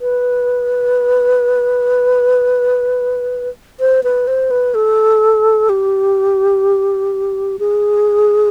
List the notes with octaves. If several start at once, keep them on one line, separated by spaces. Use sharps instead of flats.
B4
C5
B4
C5
B4
A4
G4
G#4